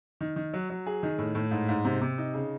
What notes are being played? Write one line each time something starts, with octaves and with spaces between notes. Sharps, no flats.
D#3
D#3
F#3
F#3
G#4
D#3
A2
A2
G#2
G#2
C3
C3
D#4
C#3